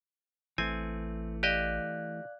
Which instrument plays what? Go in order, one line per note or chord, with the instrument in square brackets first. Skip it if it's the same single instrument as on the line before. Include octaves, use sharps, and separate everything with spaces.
[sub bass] A1 [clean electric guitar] E3 A3 [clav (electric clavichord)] C4 G#5
[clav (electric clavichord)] G4 D#5 [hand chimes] D5 F5 F#6